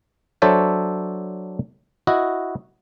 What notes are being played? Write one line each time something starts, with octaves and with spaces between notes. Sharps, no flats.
F#3 D4 A4 C5 C#5 E5
E4 F#4 D#5